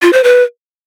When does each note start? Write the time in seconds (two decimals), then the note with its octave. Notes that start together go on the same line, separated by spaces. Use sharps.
0.02 F4
0.13 C5
0.24 B4